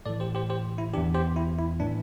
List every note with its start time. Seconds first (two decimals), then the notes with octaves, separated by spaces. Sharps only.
0.06 A2 A4 D5
0.09 E3
0.20 G4 C5
0.35 G4 C5
0.50 G4 C5
0.78 E4
0.93 E3 D4 G4
0.97 E2
1.14 G4 C5
1.36 E4
1.59 E4
1.80 A2 E3 D4